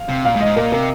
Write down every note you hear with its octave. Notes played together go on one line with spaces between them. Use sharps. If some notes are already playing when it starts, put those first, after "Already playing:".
Already playing: F5
C3
A#2 F5
G#2
D#5
G#2
A#2 A#4
C3 A#4